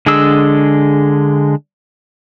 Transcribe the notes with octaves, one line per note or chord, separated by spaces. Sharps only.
D3 G#3 D4 G#4 E6